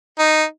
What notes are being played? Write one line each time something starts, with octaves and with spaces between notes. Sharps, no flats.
D#4